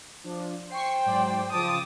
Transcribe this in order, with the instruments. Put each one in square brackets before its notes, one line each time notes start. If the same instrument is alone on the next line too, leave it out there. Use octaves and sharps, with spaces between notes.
[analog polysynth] F3 D4
[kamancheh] C5 G5 [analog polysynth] C#6 C7
[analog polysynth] G#2 F#3 D5
[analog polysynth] C#3 F3 A5 [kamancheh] D6 D#6